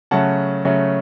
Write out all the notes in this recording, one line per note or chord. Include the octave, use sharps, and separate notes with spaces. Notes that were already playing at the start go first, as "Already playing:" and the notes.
C#3 F#3 A3 C#4 F#5 A5
C#3 F#3 A3 C#4